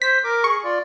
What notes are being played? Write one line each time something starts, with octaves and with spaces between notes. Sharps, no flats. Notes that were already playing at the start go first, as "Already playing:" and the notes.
C5 B6
A#4 D6
G#4 C#6
F4 D5